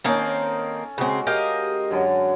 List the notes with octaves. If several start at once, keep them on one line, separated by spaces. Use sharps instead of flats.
D#3 A#3 C4 C#4 A4
C#3 G#3 C4 F#4
G4 A#4 D#5 F5
F#2 D3 F#3